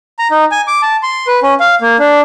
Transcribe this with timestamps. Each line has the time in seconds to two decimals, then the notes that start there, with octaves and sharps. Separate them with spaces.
0.19 A#5
0.31 D#4
0.52 G#5
0.68 D6
0.82 A5
1.03 C6
1.27 B4
1.43 C#4
1.60 F5
1.81 A#3
1.99 D4